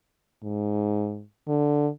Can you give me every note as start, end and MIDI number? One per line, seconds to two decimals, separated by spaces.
0.43 1.23 44
1.48 1.88 50